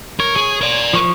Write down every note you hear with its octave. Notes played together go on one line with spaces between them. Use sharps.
A#4 C#5
G#4
A#4 D5
F3 C#6